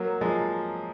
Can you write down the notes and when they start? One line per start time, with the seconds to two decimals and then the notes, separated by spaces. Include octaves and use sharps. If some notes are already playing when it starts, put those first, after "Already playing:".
Already playing: F#3 A#3
0.21 F3 G#3